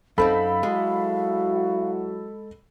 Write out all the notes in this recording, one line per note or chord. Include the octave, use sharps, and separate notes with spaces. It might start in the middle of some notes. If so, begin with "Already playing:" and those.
F#2 C4 D#4 A4 F5 B5
F#3 G#3 E4 F#4